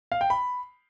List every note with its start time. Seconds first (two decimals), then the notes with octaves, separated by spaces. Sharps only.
0.12 F5
0.21 G5
0.30 B5